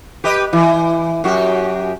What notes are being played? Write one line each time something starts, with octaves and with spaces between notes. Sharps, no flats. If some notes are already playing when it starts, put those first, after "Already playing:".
G4 B4 D#5
E3
F#2 F#4 G4